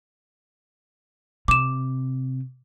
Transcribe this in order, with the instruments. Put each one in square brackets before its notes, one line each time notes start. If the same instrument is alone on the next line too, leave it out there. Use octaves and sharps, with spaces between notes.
[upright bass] C3 [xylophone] D6 E7